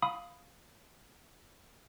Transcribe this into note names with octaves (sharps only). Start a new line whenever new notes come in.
F5 B5 D#6